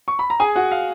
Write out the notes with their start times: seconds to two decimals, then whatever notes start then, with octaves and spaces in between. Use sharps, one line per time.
0.08 C#6
0.19 B5
0.30 A#5
0.40 G#4 G#5
0.56 F#4 F#5
0.71 F5